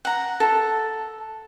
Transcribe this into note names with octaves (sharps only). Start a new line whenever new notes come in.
F#5 A#5
A4